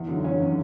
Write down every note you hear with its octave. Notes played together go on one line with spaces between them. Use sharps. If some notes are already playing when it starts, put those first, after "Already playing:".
Already playing: E2
D3 F#3
E2 C#4
D3 F#3